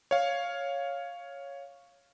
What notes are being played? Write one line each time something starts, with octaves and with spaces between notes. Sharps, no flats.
C#5 F5